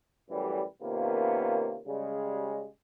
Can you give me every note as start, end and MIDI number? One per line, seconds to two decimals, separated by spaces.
0.30 0.62 33
0.30 0.62 42
0.30 0.62 45
0.30 0.62 52
0.30 0.62 55
0.81 1.78 48
0.81 1.78 51
0.81 1.78 58
0.81 1.78 59
0.81 1.78 61
0.81 1.78 65
1.87 2.65 49
1.87 2.65 55
1.87 2.65 56